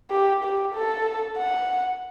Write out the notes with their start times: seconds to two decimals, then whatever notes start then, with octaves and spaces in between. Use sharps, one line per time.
0.11 G4
0.43 G4
0.74 A4
1.37 F#5